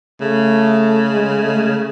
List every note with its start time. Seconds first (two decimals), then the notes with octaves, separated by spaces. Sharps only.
0.21 C#3 A3
1.12 G#3
1.42 A3